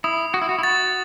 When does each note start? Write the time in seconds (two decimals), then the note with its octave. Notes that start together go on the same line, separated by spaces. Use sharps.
0.04 E4 D#6
0.34 F#4 D#6
0.42 E4
0.49 F#4
0.58 E4
0.63 F#4 A6